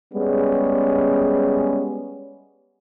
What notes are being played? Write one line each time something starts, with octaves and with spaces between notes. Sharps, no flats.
G3 G#3 B3 C#4 G#4